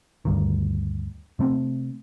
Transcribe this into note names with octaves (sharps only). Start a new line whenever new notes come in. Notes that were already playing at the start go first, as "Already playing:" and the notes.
D2 G2 D#3
C3 A3 B3 C4